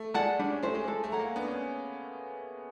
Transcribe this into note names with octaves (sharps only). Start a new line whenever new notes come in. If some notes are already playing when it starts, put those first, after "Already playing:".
Already playing: A3
G#3 D5 F#5 A5
G3 D4
C#4
A3 G4 C5
G#3
G#3 A4
A3
C#5 F#5 A#5
A#3
B3 D4
C#4